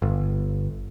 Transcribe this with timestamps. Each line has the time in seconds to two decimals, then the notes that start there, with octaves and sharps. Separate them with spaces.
0.02 G1